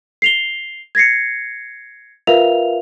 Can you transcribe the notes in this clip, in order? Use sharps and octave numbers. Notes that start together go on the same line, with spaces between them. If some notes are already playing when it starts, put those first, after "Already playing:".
C7 F7 G7
G#6 A#6 C7 C#7
F4 A#4 B4 E5 F5 F7